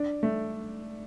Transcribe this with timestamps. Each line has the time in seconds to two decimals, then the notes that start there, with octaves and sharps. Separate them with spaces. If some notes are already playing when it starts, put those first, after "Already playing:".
Already playing: D4
0.23 A3